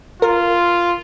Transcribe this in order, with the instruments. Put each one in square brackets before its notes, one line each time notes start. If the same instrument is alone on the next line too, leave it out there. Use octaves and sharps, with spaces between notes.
[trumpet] F4 [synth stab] A#4